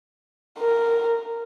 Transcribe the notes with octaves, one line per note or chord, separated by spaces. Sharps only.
A#4